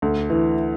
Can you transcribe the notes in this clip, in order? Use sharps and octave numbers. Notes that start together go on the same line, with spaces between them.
D2
E3